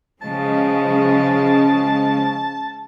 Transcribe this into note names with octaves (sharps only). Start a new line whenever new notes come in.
C#3 F3 G#3 A5